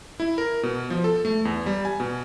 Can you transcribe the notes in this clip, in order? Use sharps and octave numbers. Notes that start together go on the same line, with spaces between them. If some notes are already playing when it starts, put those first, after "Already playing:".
E4
A#4
B2
F3
A4
A3
E2
G3
G#5
B2